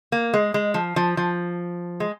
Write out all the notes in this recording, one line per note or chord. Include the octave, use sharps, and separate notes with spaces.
A#3
G#3
G#3
F3
F3
F3
G#3